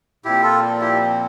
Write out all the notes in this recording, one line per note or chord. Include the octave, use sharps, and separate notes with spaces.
A#2 F3 C4 E4 G4
F4 A4
E4 G4